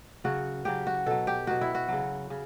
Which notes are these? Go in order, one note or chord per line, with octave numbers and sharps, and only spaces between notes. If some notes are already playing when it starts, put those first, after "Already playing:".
C#3 F#3 F#4
C#3 F#3 G4
F#4
B2 F#3 A4
G4
B2 F#3 F#4
E4
F#4
C#3 F#3
C#3